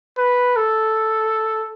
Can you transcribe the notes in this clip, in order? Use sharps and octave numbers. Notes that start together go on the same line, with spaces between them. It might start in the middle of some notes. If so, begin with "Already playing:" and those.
B4
A4